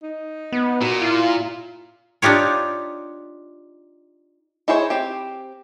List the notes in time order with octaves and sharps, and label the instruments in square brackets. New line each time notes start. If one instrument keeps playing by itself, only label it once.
[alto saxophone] D#4
[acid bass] B3
[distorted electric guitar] A#2 [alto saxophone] F#4
[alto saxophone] E4 [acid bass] F4
[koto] D4 D#4 F4 G4 C#5
[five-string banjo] D#4 E4 G#4 C5 C#5
C4 G4